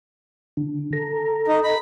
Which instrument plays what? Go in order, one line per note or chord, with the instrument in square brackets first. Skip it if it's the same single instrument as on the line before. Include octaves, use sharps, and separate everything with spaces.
[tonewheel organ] D3
A4 A#5
[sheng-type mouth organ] D#4
B5